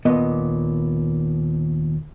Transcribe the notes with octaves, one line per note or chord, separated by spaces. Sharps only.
D#2 A#2 B3 D#5